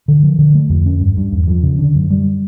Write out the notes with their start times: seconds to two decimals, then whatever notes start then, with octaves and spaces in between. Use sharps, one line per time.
0.08 D3
0.23 F3
0.38 D3
0.55 A3
0.69 F2
0.86 C#4
1.01 G2
1.17 G2
1.32 E2
1.47 F3
1.63 C#3
1.79 D3
1.95 F#2
2.10 G3